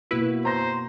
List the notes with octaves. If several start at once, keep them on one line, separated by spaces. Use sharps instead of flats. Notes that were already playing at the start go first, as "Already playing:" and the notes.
B2 A#3 E4 F#4 B4
C5 A#5 A#6